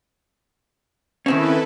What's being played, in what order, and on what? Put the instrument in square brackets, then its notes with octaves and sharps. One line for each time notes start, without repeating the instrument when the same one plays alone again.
[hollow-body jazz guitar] D#3 C4 C#4 [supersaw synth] E4 A4 B4